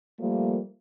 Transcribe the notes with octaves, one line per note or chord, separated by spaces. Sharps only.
F3 G3 A3 A#3